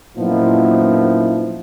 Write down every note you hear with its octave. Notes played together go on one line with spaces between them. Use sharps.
F#2 A#2 F3 B3 D#4 E4